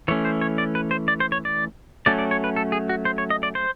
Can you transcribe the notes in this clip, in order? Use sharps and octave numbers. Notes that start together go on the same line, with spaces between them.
E3 A3 C#4 C#5
C5
C#5
D5
B4
C5
D5
C5
C#5
D5
F#3 A3 C#4 D5
D5
C#5
B4
A4
G#4
F#4
C5
C#5
D#5
D5
C5